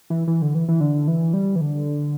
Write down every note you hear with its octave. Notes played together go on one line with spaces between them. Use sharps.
E3
E3
D3
E3
E3
D3
E3
G3
E3
D3